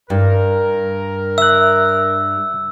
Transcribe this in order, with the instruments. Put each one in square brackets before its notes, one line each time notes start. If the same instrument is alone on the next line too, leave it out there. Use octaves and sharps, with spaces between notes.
[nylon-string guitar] G2 [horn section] A#4
[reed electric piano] E5 F#6 [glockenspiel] E6